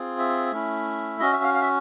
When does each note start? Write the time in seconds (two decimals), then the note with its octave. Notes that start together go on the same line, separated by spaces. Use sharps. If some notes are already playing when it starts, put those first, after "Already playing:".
Already playing: C4 F4 G#4
0.19 E5
0.52 A3 C#4 E4
1.20 C#4 F#4 D#5
1.33 E5
1.43 F5
1.54 F5
1.62 E5